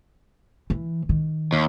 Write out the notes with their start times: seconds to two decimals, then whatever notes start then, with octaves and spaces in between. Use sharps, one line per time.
0.70 E3
1.09 D#3
1.53 D#2